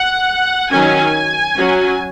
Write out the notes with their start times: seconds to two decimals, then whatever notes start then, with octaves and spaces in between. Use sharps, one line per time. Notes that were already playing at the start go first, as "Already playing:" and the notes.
Already playing: F#5
0.71 D#3 F#3 C#4 G#5
1.57 F#3 C#4